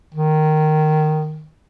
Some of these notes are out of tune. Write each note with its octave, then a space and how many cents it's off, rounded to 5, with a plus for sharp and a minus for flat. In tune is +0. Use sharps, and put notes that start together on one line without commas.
D#3 -10